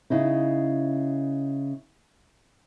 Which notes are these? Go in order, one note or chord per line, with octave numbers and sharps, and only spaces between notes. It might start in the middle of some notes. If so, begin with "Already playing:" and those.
C#3 D#4 E4